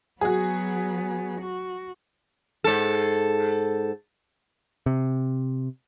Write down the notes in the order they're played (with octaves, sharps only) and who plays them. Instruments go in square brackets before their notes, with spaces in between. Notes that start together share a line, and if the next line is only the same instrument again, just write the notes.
[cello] F#3 B3 [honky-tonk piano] F#4 G#4
[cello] F#4
[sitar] G#2 A4
[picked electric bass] C3